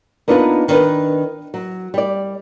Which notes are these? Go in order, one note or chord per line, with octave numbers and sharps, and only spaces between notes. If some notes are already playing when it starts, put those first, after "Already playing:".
A#3 B3 D4 D#4 F4 B4
D#3 D4 B4
F#3
G3 D5